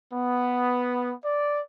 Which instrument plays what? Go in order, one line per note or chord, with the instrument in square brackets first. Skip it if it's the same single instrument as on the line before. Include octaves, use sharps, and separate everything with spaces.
[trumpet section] B3
D5